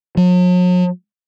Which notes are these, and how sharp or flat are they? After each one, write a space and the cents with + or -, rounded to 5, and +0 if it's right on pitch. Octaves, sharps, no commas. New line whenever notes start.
F#3 -45